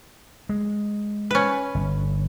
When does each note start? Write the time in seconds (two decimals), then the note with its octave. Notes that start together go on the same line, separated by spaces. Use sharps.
0.49 G#3
1.31 C#4 B4
1.75 G1